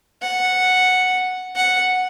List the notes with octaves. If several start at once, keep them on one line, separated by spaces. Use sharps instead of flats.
F#5
F#5